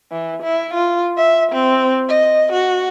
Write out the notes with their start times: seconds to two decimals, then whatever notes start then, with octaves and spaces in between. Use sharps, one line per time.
0.12 E3
0.43 E4
0.74 F4
1.18 E5
1.52 C4
2.09 D#5
2.53 F#4